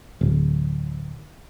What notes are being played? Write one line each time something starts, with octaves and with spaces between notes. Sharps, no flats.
D1